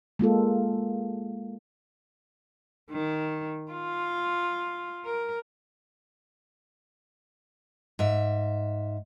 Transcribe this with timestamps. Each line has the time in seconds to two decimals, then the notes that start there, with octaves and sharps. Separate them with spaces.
0.19 G#3 A#3 F4 A4
2.91 D#3
3.72 F4
5.05 A#4
7.99 G#2 E5